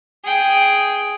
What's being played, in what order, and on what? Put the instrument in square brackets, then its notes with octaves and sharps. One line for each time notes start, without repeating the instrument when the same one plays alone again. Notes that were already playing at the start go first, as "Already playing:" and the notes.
[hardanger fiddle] G#4 G5